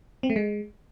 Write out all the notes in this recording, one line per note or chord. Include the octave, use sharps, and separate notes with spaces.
C4
A3
G#3